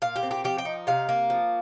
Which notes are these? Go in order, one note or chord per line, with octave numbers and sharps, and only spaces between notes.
A#2 F5
G4
C4
G4
F3 G4
G5
D#4
C3 F5
A#3
F3